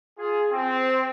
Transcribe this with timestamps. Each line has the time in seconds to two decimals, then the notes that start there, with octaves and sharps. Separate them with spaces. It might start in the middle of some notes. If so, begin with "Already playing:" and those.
0.18 F4 G#4
0.51 C4